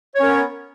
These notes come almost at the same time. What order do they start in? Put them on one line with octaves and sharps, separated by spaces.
C#5 C#4 A#4 B3